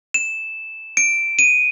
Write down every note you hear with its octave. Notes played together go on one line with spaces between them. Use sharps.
E7
D7
D#7